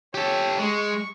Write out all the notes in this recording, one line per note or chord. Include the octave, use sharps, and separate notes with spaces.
G4 A4 C#5
G#3 C#6